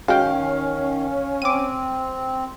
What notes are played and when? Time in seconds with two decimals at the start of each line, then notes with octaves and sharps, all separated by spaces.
0.08 D#3 G#3 C#4 F#4 F5 G5
1.42 C4 D6 D#7